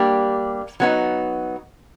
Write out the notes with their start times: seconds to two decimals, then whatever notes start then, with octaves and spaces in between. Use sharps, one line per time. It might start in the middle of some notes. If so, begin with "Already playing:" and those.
Already playing: G3 A#3 D4 G4
0.80 F#3 B3 D#4